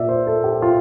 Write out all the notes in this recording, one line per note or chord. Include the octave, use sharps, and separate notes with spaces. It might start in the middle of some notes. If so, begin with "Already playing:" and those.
Already playing: A#2 D5 E5
C5
A4
G4
F4